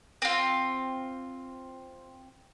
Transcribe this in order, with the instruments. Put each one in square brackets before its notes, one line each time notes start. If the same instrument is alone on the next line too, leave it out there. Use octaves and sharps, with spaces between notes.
[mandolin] C4 F4